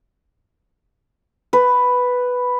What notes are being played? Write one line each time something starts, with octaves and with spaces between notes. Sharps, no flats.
B4